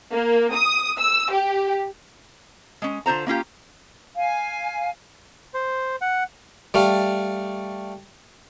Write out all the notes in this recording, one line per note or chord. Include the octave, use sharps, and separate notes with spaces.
A#3
D#6
E6
G4
G#3 C#4
D3 F4 C5 A#5
A#3 C#4 F4 G4
F5 G#5
C5
F#5
G3 A3 F5